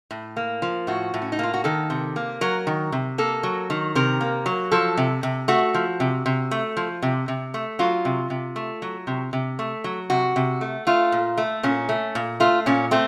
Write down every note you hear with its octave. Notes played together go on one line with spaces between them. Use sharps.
A2
A#3
F3
A2 F#4
A2
C#4
D#4
A#3 F4
F#4
D#3 A4
C3
A#3
F#3 A#4
D#3
C3
A#3 A4
F#3
D#3
C3 A#4
A#3
F#3
F3 A4
C3
C3
A3 F#4
F3
C3
C3
A3
F3
C3
C3
A3
F#3 F4
C3
C3
A3
F#3
C3
C3
A3
F#3
C3 F#4
C3
A3
A3 F4
A#2
A3
A#2 C#4
A3
A#2
A3 F4
A#2 C#4
A3 C4